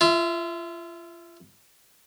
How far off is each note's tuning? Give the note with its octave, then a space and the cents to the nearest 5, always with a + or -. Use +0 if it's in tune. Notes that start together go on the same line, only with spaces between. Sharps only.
F4 -30 E5 +0